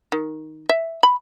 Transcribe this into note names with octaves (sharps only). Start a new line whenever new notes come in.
D#3
E5
B5